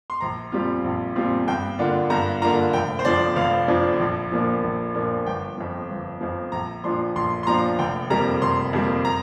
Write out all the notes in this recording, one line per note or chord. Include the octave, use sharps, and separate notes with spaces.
C6
A#1 A#5
A#2 G3 C4 F4
A#1
A#2 G3 C4 F4
G2 G5
D3 A#3 D4 F4
G2 A#5
D3 A#3 D4 F4 A#5
F1 G5
C5
F2 F3 D4 D5
F1 F5
F2 F3 D4
A#1
A#2 F3 A#3 D4
A#1
A#2 F3 A#3 D4
G1 G5
F2 F3
G1
F2 F3
A#1 A#5
A#2 F3 D4 F4 C6
A#1 C6
C6
A#2 F3 D4 F4 A#5
F1 G5
F2 C3 G3 A#3 A#5
F1 C6
F2 C3 G3 A#3
A#5